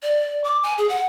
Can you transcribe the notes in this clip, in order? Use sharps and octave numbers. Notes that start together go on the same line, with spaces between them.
D5
D6
G#5
G#4
F#5